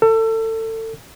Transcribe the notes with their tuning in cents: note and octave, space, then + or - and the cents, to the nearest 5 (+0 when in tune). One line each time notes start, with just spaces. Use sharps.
A4 +25 E6 +30